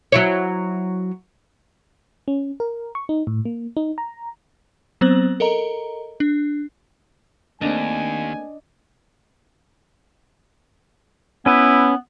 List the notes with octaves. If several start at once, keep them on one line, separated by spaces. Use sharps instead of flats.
F#3 E4 C#5
C#4
A#4
C#6
D#4
A2
A#3
D#4
A#5
F#3 B3 C4 C5 F#6 F#7
A4 A#4 D#5 A#5
D4
D#2 A3 A#3 C4 D4 D#5 G#5
B3 C#4 E4 B4